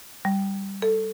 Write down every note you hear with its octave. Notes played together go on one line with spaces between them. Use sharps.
G3
A4